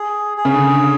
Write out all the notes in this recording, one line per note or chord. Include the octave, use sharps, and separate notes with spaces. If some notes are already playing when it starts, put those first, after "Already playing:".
Already playing: G#4
G#4
C#3
D3